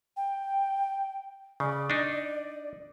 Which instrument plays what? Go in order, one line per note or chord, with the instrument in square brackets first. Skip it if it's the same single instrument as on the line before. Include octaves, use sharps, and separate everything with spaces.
[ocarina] G5
[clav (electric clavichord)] C#3 [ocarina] D5
[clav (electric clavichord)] D4 D#4